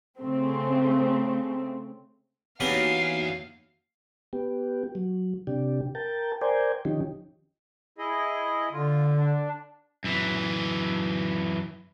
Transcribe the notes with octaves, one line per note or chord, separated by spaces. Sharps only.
C#3 A3 C4
E2 A#3 B3 C#4 D#4 F#4 G4 F5
B3 G4
F#3
C3 D4 G4
A#4 G5 A5
A#4 C5 D5 G5 G#5
D#3 F3 C#4 D#4 G4
E4 G#4 D#5
D3 F4
D4
F#2 E3